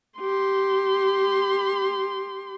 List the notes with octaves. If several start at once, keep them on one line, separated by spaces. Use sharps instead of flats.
G4 C6